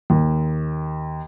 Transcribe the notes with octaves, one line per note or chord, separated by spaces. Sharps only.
D#2